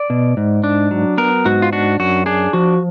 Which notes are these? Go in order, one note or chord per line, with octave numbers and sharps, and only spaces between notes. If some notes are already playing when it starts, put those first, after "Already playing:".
Already playing: D5
B2
G#2
D4
F#3
B3 A#4
G#2 F#4
F4
D4 F#4
F#2 F#4
D4 G#4
F3 F#4